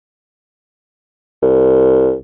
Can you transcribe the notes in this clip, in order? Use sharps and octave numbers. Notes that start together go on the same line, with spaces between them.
C2